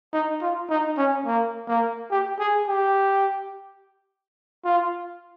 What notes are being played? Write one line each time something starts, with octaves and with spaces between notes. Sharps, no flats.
D#4
F4
D#4
C#4
A#3
A#3
G4
G#4
G4
F4